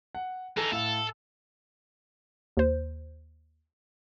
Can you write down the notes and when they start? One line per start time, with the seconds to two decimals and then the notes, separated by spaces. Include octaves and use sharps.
0.15 F#5
0.57 E3 D#4 A4 G#5
0.72 A2 A4 F5 F7
2.57 D#2 C5